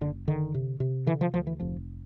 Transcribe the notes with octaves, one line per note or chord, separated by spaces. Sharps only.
F#1 D3
D3 D#3
C3
C3
D3 E3
F3
D2 F3
E3
F1 F3